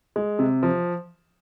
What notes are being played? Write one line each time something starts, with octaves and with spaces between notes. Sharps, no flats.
G#3
C3
F3